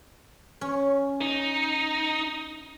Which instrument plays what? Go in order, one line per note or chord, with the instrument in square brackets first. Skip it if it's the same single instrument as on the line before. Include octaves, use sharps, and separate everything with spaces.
[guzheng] C#4
[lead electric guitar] D#4